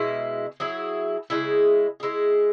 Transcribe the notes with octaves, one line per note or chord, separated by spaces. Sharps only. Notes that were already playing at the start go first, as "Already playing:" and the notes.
Already playing: B2 G#3 E4
F#3 E4 G#4
C#3 G#3 E4 G#4
G#3 E4 G#4